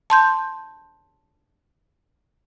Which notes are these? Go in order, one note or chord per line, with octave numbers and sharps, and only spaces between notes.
A5 C6 G6